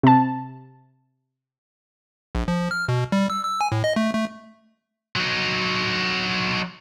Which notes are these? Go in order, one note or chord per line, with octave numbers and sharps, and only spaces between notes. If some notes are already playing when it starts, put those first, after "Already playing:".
C3 A5
A#1
F3
F6
B2
G3
E6
E6
G#5
A2
D#5
A3
A3
F#3 D#4